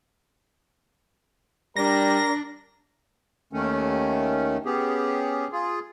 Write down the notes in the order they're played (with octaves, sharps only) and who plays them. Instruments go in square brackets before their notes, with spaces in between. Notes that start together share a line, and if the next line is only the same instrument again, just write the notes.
[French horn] G3 [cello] D4 [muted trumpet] A#4 [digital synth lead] A#6
[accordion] D#2 D#3 A3 C#4
B3 C#4 G4 G#4
F4 G#4